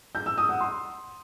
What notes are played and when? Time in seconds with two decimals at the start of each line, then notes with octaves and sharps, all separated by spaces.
0.15 G6
0.26 E6
0.38 D#6
0.49 F#5
0.60 C6